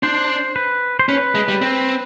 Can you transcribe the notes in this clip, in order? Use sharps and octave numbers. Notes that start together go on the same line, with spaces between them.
D4 C5
B4
C5
C#4 B4
G#3
G3
C4